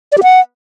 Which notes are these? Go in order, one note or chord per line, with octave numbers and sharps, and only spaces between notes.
D5
G4
F#5